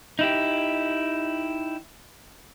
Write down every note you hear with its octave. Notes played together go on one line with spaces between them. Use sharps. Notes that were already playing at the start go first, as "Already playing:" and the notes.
D#4 E4 G4